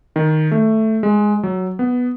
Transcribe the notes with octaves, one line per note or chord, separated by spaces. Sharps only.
D#3
A3
G#3
F#3
B3